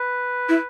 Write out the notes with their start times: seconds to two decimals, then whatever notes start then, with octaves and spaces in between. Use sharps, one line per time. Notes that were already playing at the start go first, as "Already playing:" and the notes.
Already playing: B4
0.49 E4